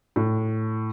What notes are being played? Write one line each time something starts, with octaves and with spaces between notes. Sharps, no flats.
A2